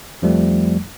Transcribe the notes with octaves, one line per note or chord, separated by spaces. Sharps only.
F2 F3 G3 A3